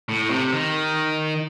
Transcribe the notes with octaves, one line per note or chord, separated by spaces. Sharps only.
A2
C3
D#3